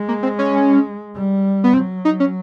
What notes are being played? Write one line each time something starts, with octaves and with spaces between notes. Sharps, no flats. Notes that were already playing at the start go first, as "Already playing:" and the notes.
Already playing: G#3
A#3
C4
C#4
G3
B3
F#3 C4
D#4
C#4